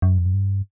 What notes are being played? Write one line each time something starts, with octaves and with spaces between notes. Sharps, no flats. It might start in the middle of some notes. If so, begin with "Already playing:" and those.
F#2
F2
F#2
G2